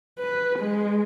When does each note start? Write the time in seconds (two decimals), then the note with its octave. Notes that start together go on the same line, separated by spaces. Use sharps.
0.19 B4
0.59 G#3